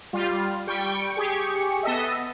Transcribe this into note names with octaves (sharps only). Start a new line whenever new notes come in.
G3 F4
G3 G5 C#6
G4 G#4 C#6
B3 A4 D#5 E5